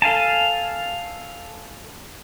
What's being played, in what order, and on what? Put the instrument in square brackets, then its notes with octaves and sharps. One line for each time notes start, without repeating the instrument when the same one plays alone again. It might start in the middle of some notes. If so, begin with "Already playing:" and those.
[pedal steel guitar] A4 F5 G#5 A5